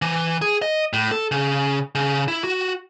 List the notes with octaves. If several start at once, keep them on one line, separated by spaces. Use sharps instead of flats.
E3
G#4
D#5
A2
A4
C#3
C#3
E4
F#4